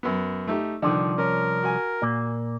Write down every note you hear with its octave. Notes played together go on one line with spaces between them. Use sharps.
F#2 B3
A3 D#4 G4
C2 D3 D#3 F3 D5
C#4 A#4
F#4 G#5
A#2 A#3